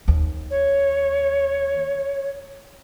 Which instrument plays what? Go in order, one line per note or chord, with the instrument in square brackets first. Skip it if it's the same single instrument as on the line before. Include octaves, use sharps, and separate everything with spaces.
[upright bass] D#2
[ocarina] C#5